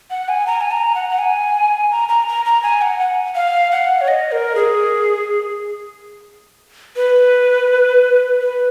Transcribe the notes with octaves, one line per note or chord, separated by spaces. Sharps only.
F#5
G#5
A#5
G#5
A#5
F#5
F#5
G#5
A#5
A#5
A#5
A#5
G#5
F#5
F#5
F5
F#5
C#5
D#5
A#4
G#4
B4
B4